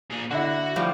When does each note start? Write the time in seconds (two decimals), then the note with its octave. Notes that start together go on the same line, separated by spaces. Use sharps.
0.11 A#2 G#4
0.31 D3 E4 F#4 F#5
0.76 A2 F3 G3